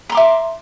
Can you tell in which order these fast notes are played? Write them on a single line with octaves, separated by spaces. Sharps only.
A#5 C6 D6 E5